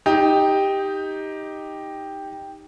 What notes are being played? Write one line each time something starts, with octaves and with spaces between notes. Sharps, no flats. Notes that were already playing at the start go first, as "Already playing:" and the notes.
D#4 G4